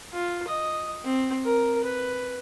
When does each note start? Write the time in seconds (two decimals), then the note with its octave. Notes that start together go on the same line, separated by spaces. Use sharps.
0.13 F4
0.48 D#5
1.05 C4
1.45 A#4
1.84 B4